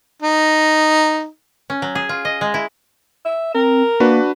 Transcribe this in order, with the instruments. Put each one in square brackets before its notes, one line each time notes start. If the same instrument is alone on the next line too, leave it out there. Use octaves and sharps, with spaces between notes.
[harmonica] D#4
[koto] C#4
F#3
G#4
F4
D#5
G#3
E4
[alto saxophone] E5
[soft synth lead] C4 [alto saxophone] A#4
[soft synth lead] A#3 [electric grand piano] D4 F#4 B4